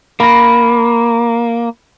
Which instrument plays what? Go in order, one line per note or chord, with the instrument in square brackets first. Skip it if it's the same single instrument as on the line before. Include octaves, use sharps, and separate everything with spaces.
[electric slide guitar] A#3 [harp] B5 A#6